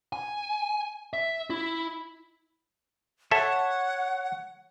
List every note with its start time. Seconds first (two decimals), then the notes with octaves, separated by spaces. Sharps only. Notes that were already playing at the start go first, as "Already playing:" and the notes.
0.13 G#5
1.13 E5
1.50 E4
3.31 A4 C#5 E5 F#5